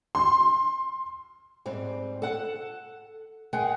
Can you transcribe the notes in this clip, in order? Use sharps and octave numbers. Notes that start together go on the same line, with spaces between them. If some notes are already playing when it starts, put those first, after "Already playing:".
C6
G#2 G3 C4
A4 F#5
G#3 G#4 A#4 F#5 G5